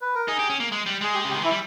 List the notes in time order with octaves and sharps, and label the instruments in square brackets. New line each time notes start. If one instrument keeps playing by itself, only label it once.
[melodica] B4
A#4
[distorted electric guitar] D#4 [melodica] G#4
[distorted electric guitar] G4
C#4
A#3
G#3
G3
[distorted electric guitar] G#3 [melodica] G#4
[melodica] G4
[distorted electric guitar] C#3
[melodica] G4
[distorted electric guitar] D#3
[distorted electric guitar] E3 [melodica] E4
[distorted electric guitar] G3